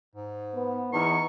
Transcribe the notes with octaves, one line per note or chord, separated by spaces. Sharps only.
G#2
B3
E2 D#4 C#6